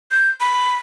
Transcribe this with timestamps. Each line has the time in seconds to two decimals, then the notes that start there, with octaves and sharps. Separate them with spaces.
0.11 G6
0.40 B5